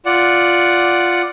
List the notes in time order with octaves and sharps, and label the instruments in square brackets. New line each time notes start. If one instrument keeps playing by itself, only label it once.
[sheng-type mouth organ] F4 D5 F#5